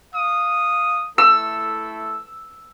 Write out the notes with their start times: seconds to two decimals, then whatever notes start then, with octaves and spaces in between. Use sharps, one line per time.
0.14 F5 D#6
1.18 A3 E4 A4 E6